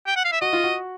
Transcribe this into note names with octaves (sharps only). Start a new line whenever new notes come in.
G5
F#5
F5
E5
F#4 D#5
F4
F#4